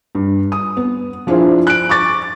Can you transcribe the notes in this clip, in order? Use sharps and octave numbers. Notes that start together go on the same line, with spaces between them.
G2
D#6
B3
F3 D4 E4 F4 G#4 C5
F#6 D7
C#6 D6 A6